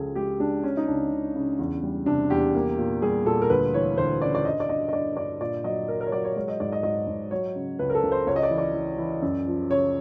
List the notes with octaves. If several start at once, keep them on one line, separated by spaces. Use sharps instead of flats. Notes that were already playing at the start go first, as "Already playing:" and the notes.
Already playing: C#2 F3 G#4 A4
G#3 G4
G#3 D4
C#3 C#4
D#4
C#2 D4
C#3
C#3
E2
G3
C3 D4
E2 G4
A#3
A#2
G3 G#4
A#2 A4
A#4
D2 B4
E3 C#5
D2 C5
C#3 D5
D5
G2 D#5
D5
G2 D#5
D#5
G2 D5
G2 D5
A#2 D5
F#3 D#5
F#3 A#4
A#4
C#5
F#3 D5
C#5
G#3 C#5
D#5
G#2 D5
D#5
G#2 D#5
G#2
F#3 C#5
C#3
C#2 B4
A#4
A4
C#2
C5
C#2 C#5
D#5
D5
E3
D5
E3
E3
F#2
F3
C#3 C#5